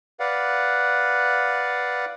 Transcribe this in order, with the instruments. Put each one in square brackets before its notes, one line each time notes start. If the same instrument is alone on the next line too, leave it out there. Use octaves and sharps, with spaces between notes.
[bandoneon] B4 D5 F5 F#5